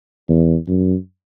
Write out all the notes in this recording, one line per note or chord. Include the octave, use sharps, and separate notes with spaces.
E2
F#2